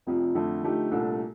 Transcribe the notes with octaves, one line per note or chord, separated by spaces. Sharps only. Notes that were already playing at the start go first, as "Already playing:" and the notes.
F1 F2 C3 F3
F2 D3 A3
D3 F3 A3 D#4 G4
C2 A#2 A3 D4 A4